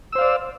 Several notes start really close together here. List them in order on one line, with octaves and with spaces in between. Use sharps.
E6 C5 F5 D5